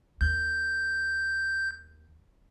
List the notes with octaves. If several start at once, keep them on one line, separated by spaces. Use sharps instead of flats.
D#2 G6